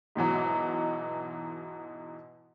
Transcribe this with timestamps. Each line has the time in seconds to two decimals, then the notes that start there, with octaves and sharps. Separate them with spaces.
0.15 G#2 B2 E3 F#3